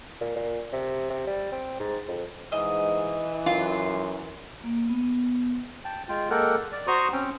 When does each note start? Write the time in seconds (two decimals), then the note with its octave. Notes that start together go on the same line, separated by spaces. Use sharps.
0.21 A#2
0.36 A#2
0.73 C3
1.10 C3
1.27 G3
1.52 C4
1.80 G#2
2.08 F2
2.52 G#2 E3 D#5
3.46 F#2 F4
4.64 A#3
4.89 B3
5.85 G5 A5
6.09 G#3 F4 G5
6.30 G#3 A#3 A4 A#4 F#5 G5
6.72 D5
6.87 F#4 C5 A#5 C6 C#6 D#6
7.12 C4 C#4 G5